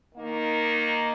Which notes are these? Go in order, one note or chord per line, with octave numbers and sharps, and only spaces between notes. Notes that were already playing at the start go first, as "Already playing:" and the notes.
D#3 A#3 D#4